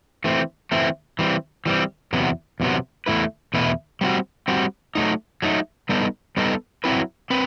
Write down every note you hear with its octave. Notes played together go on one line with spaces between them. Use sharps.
E3 A3 C4
E3 A3 C4
E3 G3 C4
E3 G3 C4
E2 C3 F#3 B3
E2 C3 F#3 B3
E2 B2 A3 E4 B4
E2 B2 A3 E4 B4
G3 C4 F#4
G3 C4 F#4
F#3 A3 D#4
F#3 A3 D#4
G3 B3 D#4 A4
G3 B3 D#4 A4
F#3 C4 E4 B4
C4 B4